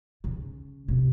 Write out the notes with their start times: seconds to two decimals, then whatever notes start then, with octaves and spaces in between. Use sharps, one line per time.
0.24 C#3
0.88 C3